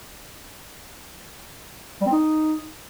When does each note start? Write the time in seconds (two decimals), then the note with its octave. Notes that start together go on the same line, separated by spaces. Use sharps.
2.01 G3
2.06 C4
2.12 D#4